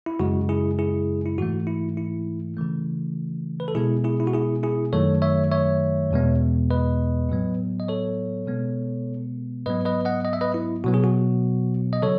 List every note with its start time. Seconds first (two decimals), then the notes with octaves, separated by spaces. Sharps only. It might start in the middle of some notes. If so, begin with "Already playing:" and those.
0.06 E4
0.20 F#2 C#3 G#3 F#4
0.49 E4 G#4
0.79 E4 G#4
1.26 E4
1.38 G#2 E3 A3 F#4
1.67 E4
1.97 E4
2.57 C#3 E3 A3
3.60 B4
3.68 A4
3.75 B2 G#3 B3 E4 G#4
4.04 E4 G#4
4.20 E4
4.27 F#4
4.34 E4 G#4
4.63 E4 G#4
4.93 F#2 D#3 F#3 A3 A4 C#5
5.22 C#5 E5
5.52 C#5 E5
6.11 E2 B2 G#3 B3
6.70 B4 D#5
7.29 A2 F#3 B3
7.80 D#5
7.88 A4 C#5
8.47 B2 G#3 B3
9.66 G#2 F#3 B3 B4 D#5
9.85 B4 D#5
10.05 D#5 F#5
10.25 D#5
10.33 E5
10.41 B4 D#5
10.54 E4
10.84 B2 F#3 B3 F#4
10.94 G#4
11.04 F#4
11.93 D#5
12.02 C#3 F#3 A4 C#5